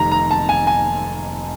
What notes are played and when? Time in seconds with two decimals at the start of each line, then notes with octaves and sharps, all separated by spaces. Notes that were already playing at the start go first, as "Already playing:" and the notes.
Already playing: F1 F2 C3 D#3 A#5
0.12 A#5
0.31 A5
0.49 G#5
0.67 G#5